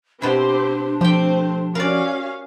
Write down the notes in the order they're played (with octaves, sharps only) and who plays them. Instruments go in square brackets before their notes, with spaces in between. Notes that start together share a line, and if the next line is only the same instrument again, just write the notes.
[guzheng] B2 E4 [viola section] C4 G4 C5 [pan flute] D4
[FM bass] F3 [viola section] A3 C4 C5 [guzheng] G4 G5
[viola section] C#4 F#4 F5 [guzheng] A#4 D5